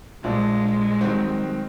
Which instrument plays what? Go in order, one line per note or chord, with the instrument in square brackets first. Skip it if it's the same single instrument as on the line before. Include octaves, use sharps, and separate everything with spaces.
[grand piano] A#1 F3 D4 [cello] G#3
[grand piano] D#3 F#3 C4